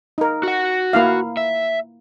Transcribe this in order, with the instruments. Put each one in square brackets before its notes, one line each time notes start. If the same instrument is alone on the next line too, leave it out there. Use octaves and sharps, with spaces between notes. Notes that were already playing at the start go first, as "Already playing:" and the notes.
[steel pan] D#4 A#4
[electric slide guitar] F#4 F#5
[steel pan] A#3 E4 F5
[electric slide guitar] E5